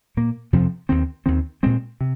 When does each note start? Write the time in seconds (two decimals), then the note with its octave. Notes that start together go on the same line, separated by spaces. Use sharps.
0.17 A#2 A#3
0.53 F2 C3 F3 C4
0.89 D#2 D#3 C4
1.26 D#2 D#3 C4
1.63 A#2 G#3 C4
2.01 C3